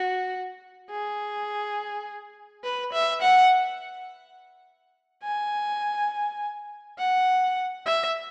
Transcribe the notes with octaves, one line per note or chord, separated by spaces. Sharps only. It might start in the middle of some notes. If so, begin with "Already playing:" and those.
Already playing: F#4
G#4
B4
E5
F#5
G#5
F#5
E5